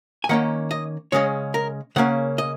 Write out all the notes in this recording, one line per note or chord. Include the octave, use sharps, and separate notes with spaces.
G#5
D#3 A#3 C#4 F#5
D#5
C#3 G#3 C#4 C#5
A#4
C#3 A#3 C#4 F#5
D#5